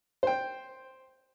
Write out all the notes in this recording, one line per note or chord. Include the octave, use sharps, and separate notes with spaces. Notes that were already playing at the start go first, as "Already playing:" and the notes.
C5 G5